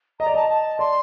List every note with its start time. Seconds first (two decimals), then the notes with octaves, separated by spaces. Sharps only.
0.19 D#5 A#5
0.26 D5
0.34 D#5 A5
0.49 A5
0.79 D5 C6